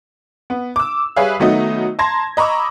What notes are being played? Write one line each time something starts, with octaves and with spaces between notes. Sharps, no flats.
B3
D6 E6
G3 G#4 B4 C#5 E5 F5
D#3 F#3 A3 B3 D#4 D#5
A5 A#5 C6 G#6 A#6
D#5 A#5 B5 C#6 D6 E6